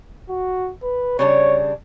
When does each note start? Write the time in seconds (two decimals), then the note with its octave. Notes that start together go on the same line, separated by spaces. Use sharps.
0.29 F#4
0.83 B4
1.19 C#3 G3 D4 C#5